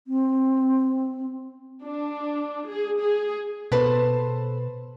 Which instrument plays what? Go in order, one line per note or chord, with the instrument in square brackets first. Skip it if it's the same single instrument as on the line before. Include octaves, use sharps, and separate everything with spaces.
[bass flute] C4
[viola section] D4
G#4
G#4
[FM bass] B2 [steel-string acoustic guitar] A4 B4 C5